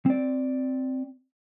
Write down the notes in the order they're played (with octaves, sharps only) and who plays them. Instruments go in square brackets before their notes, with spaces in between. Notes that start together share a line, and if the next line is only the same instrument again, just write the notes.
[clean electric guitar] C4 D5